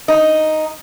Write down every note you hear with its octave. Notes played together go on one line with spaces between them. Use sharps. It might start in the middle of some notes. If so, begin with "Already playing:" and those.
D#4